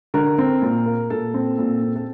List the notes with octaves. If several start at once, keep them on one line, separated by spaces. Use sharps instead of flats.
D3 A#4
C4
A#2
A#3
A#2 A4
C4
A#2
C4
A4